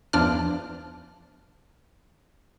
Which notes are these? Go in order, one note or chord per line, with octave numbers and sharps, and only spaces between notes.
E2 F3 D4 F6